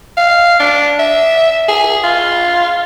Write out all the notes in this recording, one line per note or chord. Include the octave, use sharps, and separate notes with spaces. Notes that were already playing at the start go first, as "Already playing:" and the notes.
F5
D4
E5
G#4
F4